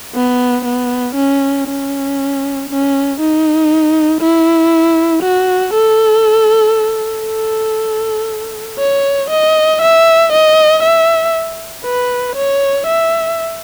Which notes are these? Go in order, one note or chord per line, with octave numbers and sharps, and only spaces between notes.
B3
B3
C#4
C#4
C#4
D#4
E4
F#4
A4
A4
C#5
D#5
E5
D#5
E5
B4
C#5
E5